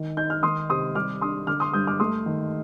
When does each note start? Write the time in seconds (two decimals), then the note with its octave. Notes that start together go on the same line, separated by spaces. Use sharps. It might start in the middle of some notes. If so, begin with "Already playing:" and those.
Already playing: D#3
0.17 D#4 G6
0.30 F6
0.43 D#3 C6 D#6
0.70 C3 C6 D#6
0.95 G3 D6 F6
1.21 D4 C6 D#6
1.47 D3 D6 F6
1.60 C6 D#6
1.73 G2 D#6 G6
1.87 D6 F6
2.00 A3 C6 D#6
2.26 D#3